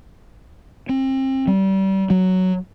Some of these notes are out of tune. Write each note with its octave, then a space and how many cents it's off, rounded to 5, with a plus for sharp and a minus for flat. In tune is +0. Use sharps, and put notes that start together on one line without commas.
C4 +30
G3 -30
F#3 +5